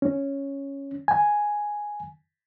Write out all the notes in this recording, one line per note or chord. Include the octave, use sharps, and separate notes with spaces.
C#4
G#5